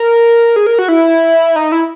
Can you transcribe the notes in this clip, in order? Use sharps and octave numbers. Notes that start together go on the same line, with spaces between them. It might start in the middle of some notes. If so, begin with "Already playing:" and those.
Already playing: A#4
G#4
A#4
F#4
E4
D#4
E4